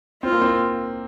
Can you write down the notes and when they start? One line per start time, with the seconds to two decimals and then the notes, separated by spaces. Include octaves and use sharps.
0.23 C4 F4
0.32 A#3
0.42 C4